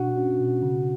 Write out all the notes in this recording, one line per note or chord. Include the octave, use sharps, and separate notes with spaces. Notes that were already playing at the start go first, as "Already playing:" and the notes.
Already playing: B2 D4 F#4 F#5
C#4
B2
C#3